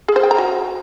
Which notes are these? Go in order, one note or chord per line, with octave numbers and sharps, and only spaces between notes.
G#4
C5
G5
A#5
F#4